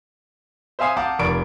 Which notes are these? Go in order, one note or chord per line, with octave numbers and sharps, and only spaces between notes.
C5 E5 F5 G#5 D#6 C7
F5 F#5 A5 A#5 D6 G6
F1 A#4 D5 C#6 D7